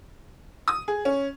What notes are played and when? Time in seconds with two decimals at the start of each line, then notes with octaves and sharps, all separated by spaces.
0.68 D#6
0.88 G#4
1.05 C#4